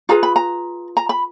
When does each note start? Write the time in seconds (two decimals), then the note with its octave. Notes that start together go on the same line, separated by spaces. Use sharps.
0.09 F4 G#4 B4 A#5
0.23 B5
0.36 A#5
0.97 A#5
1.09 B5